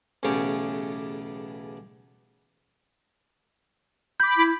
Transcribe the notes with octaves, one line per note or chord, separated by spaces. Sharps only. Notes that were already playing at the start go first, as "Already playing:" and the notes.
B1 E2 A2 C#3 C#4 G4
B5 D6 G6
E4